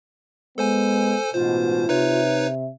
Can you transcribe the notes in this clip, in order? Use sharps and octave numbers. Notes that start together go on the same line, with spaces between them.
G#3 B3 A4 C5 G#5
A1 G#2 B2 F4 C5
C3 D#4 B4 C#5 E5